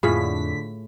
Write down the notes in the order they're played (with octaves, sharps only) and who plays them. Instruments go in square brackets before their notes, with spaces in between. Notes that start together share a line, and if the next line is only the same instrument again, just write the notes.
[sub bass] F2 [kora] A2 [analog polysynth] D3 B6 [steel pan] F4 G#4 B5